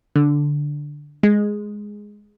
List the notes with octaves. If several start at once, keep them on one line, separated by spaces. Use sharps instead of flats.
D3
G#3